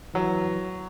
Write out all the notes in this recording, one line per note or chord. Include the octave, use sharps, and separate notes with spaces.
E3 F#3